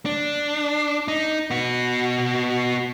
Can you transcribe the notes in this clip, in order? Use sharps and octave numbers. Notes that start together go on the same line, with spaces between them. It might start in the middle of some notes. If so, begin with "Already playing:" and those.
D4
D#4
B3 F#4